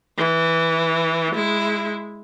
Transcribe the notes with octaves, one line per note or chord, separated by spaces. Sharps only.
E3
G#3 E4